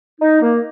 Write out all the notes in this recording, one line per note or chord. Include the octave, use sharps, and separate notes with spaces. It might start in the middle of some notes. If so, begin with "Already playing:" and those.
D#4
A#3